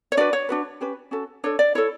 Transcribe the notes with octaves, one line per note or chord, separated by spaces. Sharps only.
C#5
D4 F#4 B4 D5
C#5
D4 F#4 B4
C#4 G4 B4
C#4 F#4 A4
D4 A4 C#5
D5
E4 A4 C#5